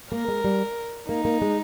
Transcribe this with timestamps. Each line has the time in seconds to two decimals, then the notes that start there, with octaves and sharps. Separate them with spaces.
0.12 A#3 A#4
0.28 G#3
0.44 G3
1.09 A#3 D#4
1.25 A#3
1.42 G#3